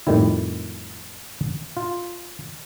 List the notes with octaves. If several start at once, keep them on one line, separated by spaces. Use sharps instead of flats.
F2 A2 D#3 G3 E4
F4